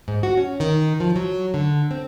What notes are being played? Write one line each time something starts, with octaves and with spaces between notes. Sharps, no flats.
G#2
F#4
C#4
D#3
F3
F#3
D3
C4